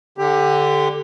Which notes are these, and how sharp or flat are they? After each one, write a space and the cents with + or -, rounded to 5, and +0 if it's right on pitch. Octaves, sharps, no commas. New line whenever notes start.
D3 +5 G4 +15